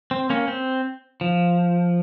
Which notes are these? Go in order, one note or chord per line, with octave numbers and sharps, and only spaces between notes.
C4
A#3 C#4
C4
F3